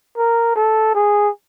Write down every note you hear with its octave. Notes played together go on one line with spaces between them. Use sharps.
A#4
A4
G#4